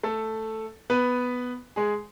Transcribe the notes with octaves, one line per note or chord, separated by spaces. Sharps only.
A3 A4
B3 B4
G#3 G#4